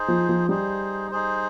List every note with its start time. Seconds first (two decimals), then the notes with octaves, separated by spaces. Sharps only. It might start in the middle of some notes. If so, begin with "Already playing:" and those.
Already playing: D#4 G#4 C5
0.08 F3
0.29 F3
0.49 G3 D#4 G#4 C5
1.11 D#4 G#4 C5